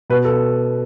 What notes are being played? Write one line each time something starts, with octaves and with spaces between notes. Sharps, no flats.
B2 B4
A4